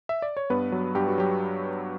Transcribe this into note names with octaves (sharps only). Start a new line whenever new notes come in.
E5
D5
C#5
G2 B3 B4
F#3
G2 G4
F#4
F#3 G4